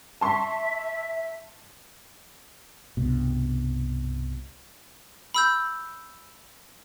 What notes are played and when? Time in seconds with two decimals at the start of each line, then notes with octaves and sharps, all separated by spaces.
0.21 E5 A5 C6 C#6
2.97 C2 G2 B2
5.34 B5 E6 G6